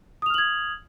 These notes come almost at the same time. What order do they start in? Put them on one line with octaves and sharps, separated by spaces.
D#6 F7 F6 F#7 G#6